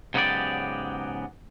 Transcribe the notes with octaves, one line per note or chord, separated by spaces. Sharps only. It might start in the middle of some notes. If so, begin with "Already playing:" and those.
G#2 C#3 F#3 B3 G4 D5